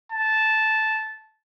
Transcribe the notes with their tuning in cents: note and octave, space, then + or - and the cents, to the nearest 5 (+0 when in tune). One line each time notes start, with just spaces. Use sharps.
A5 -10